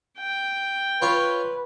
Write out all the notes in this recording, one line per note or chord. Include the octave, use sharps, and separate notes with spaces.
G5
F4 B4 C#5